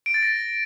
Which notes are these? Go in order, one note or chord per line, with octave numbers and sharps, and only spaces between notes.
D7
A6
A#6